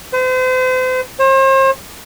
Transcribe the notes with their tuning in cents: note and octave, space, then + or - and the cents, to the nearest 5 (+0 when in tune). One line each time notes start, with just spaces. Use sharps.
C5 -40
C5 +40